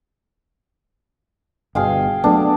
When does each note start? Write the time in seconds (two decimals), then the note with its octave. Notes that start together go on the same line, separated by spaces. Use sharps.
1.75 G1 B2 G#4 F5 G5
2.24 F#3 A3 B3 D4